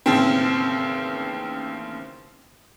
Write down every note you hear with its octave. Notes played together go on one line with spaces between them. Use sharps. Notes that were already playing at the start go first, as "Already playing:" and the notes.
A1 D#2 C#3 C4